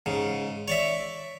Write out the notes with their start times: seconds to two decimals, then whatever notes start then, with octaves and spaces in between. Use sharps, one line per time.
0.06 G#2 C#3
0.68 C#5 D5 E5